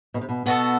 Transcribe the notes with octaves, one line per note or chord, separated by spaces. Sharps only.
B2
C3
B2
B2 B3 F#4 A4